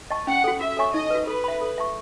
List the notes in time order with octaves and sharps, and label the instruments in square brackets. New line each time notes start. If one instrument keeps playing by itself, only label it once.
[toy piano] D#5 A5 C#6
[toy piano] C#4 [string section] F#5
[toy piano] F#4 A4
[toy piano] F#4 [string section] E5
[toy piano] A4 C#5 G#5 C#6
[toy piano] D#4 [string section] D#5
[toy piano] F#4 B4
[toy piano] A4 [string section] B4
[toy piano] E5 B5
A4
E5 A5 C#6